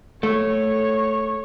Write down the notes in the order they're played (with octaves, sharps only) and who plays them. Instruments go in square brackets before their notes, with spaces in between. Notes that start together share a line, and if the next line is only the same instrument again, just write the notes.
[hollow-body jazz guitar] A3 [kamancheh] C#5